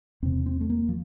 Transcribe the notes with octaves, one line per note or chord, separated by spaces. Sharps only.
E2 C3 C4
C4
A3
A#3
F3